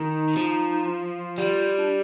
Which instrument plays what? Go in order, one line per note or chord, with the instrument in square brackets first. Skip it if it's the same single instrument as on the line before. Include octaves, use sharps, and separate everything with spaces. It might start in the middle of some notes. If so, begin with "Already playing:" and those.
Already playing: [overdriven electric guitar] D#3 [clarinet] D#4
[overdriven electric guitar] F3
[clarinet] F4
[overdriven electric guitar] G3
[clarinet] D4